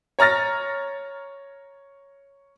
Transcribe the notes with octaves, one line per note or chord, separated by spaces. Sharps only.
C#5 A#5 F6 A6 A#6